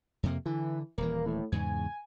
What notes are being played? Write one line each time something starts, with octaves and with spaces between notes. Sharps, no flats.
F2 C3 A#3
D3 E3
D#1 E3 A#3
A2
E2 G#2 C#3 G#5